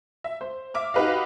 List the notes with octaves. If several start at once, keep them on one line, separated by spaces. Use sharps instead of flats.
E5
C5
E5 D6 F6
D#4 F#4 G4 B4 D#5 F5